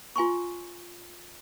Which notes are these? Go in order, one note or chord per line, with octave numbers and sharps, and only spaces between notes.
F4 G#5 C6 C#6